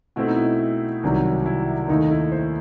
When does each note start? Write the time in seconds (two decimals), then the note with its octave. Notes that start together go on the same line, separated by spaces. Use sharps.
0.16 B2 A3 C4 E4
0.27 D#4
0.36 E4
1.03 C2 C3 D#3 F#3
1.46 E4
1.88 D#2 D#3 A3 D#4
2.11 E4
2.32 C5